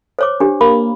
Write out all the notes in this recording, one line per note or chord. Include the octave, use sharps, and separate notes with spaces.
C5 C#5 D6
D4 G4
A#3 B5